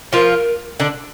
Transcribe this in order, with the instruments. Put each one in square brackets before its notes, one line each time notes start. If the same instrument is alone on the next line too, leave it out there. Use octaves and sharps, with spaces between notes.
[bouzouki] F3 F4 [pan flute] A#4
[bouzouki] D3 D4